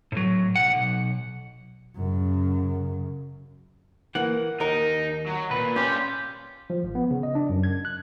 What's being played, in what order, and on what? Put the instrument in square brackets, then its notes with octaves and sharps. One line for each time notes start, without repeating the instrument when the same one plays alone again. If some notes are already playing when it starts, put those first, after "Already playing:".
[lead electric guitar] A2 F#3
B1 F#5
B1
[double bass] F#2 C#3
[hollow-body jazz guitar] E3 A#3 [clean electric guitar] F#5
[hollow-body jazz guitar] D#2 A#4 [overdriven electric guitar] D#4
[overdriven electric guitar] F#3
[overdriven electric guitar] A#2 [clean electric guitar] B4
[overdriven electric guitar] G3 C6 [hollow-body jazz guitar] C#4 [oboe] G4
[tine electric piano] F3
G#1
B3
C#3
D#5
D4
F#2
G#6
F#6